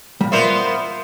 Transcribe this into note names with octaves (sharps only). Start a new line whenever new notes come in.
A#2 G3
B3 F4 A#4 C5 D5 E5